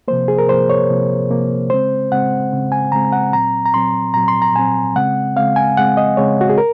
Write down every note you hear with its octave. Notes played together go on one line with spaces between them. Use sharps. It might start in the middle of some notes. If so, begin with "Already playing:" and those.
C3 F3 A#3 C5
G#4
A#4
C3 F3 A#3 C5
C#5
C3 F3 A#3
C3 F3 A#3
C#3 G#3 C4 C5
C#3 G#3 C4 F#5
C#3 G#3 C4
G#5
C#3 G#3 C4 A#5
F#5
A#2 F#3 C4 A#5
A#5
A#2 F#3 C4 C6
A#2 F#3 C4 A#5
C6
A#5
A#2 F#3 C4 G#5
C#3 G#3 C4 F#5
C#3 G#3 C4 F5
G#5
C#3 G#3 C4 F#5
D#5
C#3 G#3 C4 C#5
F#4
G#4
A#4